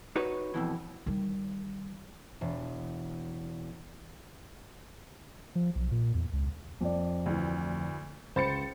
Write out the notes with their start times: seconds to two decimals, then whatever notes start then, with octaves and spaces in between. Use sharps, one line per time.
0.16 D#4 F#4 B4 C#5
0.54 F2 B2 E3
1.06 D#3 G3
2.41 E1
5.55 F3
5.75 B1
5.91 A#2
6.14 E2
6.33 C#2
6.81 F2 D5
7.26 D2 E3
8.36 C#2 C5 B5 A6 C#7